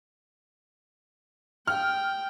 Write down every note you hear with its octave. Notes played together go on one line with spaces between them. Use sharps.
G5 F6